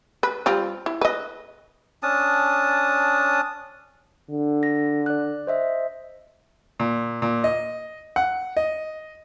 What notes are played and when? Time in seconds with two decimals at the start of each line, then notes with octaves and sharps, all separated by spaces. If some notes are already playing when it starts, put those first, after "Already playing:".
0.23 B4
0.46 G3 C4 F4
0.86 E4
1.01 B4 D#5
2.03 C#4 D4 A5 D#6
4.30 D3
4.63 A#6
5.06 D5 F#6
5.47 C5 D#5 E5
6.80 A#2
7.22 A#2
7.44 D#5
8.16 F#5
8.57 D#5